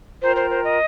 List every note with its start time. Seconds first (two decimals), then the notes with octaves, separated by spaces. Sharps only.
0.22 F4 A#4 C5 G5 A#5
0.36 C5
0.50 C5
0.64 D#5